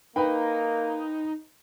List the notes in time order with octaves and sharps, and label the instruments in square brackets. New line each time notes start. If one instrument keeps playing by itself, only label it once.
[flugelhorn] A#3 [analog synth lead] D#4 [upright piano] B4 G5